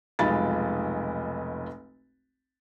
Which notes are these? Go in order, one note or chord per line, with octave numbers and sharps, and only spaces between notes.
F1 B1 G#3 F4 B5 A6